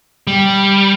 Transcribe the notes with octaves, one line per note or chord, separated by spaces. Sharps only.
G3